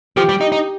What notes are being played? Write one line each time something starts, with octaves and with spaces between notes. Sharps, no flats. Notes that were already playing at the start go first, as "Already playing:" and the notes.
F3 G4
G3
D#4
D#4